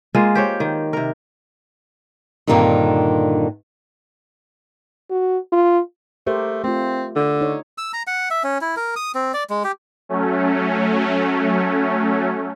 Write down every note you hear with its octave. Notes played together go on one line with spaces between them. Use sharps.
G#3 A#3 F4
G4 C5 C#5
D#3
C3 A#4
G2 A#2 D3 D#3 A#3 C4
F#4
F4
A3 G4 A#4 C5
A3 C4 F4
D3
D#4 C#5
E6
A#5
F#5
E5
C#4
E4
A#4
D#6
C4
D5
G#3
G4
F#3 A3 C#4